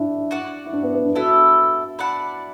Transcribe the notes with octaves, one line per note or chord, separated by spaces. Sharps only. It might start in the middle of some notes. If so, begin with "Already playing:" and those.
Already playing: D4 E4
F#4 D5 F#5
E4
D4
B3
B3
D4
B3 E4 F#4 A4
E4 D5 F#5 A5